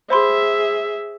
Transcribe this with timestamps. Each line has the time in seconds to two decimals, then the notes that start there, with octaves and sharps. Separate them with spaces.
0.10 G#4 C5 E5 B5 C6